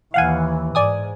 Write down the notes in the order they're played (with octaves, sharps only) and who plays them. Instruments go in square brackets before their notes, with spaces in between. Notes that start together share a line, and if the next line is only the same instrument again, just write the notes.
[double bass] D#2 E3 [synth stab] F5 F#5 G#5
[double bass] G#2 [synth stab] D5 G#5 D#6